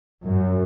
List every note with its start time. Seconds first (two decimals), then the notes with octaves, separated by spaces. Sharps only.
0.24 F#2